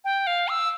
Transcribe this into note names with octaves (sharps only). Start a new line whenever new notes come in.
G5
F5
E6